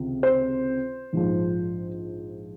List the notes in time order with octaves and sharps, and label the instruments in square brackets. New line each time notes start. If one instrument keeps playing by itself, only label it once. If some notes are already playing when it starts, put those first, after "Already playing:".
Already playing: [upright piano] C#2 C3 D#3
C5
A#1 G#2 F3